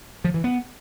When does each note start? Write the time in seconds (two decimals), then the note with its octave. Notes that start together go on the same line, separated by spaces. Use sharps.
0.24 F3
0.34 E3
0.44 B3